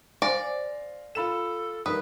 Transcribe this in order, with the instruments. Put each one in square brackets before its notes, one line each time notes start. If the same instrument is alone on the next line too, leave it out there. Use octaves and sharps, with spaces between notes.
[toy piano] C5 G#5 [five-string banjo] D5 [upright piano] F5 C6 A#6
[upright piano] F4 B5 E7 [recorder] A4
[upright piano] D#3 G3 A#3 [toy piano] A4 D#6 [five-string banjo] B4